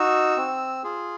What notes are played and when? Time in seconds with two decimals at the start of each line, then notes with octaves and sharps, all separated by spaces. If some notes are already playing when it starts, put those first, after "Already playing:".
Already playing: D#4 F#4 E6
0.37 C4
0.84 F4 G#4